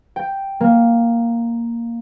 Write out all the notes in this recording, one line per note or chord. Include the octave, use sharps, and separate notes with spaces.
G5
A#3